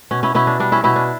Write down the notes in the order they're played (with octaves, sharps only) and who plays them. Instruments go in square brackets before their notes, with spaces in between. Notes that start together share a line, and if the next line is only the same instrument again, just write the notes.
[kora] B2 C#4
C#4 E4
B2 C#4 E4
D4
G3 D4
C#4 E4
B2 C#4 E4
D4